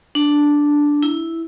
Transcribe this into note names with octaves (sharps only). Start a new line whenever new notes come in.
D4
E4